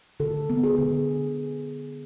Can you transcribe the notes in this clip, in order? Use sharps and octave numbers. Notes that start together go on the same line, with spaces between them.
D3 A4
B3
G#4
D3